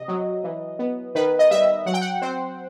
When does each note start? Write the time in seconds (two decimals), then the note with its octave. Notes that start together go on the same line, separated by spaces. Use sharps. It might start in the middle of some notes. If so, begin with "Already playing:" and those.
Already playing: C3 D#5
0.08 F#3
0.44 E3
0.79 B3
1.15 D#3 B4
1.39 D#5
1.51 G3 E5
1.86 F#3 F#5
1.94 G5
2.02 F#5
2.22 C4 C5